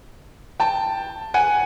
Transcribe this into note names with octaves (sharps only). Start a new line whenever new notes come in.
G5 A5
F#5 G#5